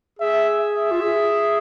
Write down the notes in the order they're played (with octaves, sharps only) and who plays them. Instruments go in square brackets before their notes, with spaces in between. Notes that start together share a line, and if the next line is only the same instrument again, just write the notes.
[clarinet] G#4 [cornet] E5
[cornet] E5
[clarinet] F4
G#4